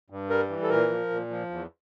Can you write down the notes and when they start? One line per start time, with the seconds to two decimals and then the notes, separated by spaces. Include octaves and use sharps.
0.10 G2
0.29 G3 A#4
0.49 E3
0.63 A4
0.69 A#2 A#4
0.89 F3
1.10 A#2
1.30 F3
1.50 E2